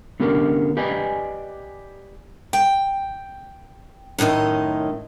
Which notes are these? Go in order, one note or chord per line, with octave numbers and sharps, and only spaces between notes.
D3 B3 C#4 G4 A#4
G4 B4 D5 D#5 G#5
G5
F#2 A2 D#3 D#5